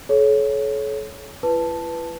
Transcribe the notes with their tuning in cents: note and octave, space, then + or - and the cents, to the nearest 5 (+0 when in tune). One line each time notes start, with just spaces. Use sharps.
A4 -40 C#5 +0
E4 +45 B4 +0 A5 +0